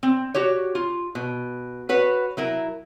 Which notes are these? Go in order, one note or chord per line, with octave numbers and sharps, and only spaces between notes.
C4
F#4 G4 C#5
F4
B2
F#4 B4 C#5
F#3 E4 A#4